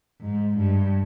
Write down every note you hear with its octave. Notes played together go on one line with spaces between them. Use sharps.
G#2
G2